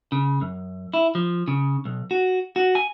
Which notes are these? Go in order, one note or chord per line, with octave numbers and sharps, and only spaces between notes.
C#3
F#2
E4
F3
C#3
B1
F#4
F#4
G#5